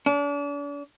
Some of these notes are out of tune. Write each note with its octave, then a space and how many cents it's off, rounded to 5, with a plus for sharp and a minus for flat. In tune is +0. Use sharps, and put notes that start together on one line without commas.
D4 -40